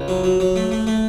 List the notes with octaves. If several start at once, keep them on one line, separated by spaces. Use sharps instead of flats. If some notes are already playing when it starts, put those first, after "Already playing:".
Already playing: C#2
F#3
F#3
F#3
A3
A3
A3